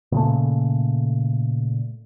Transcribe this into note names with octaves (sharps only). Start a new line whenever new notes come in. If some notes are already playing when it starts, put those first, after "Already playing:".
A#2 C#3 A3